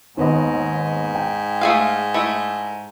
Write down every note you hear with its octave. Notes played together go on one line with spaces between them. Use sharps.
D#2 G#2 B3 D#5
G5
A3 G#4 F5
A3 E4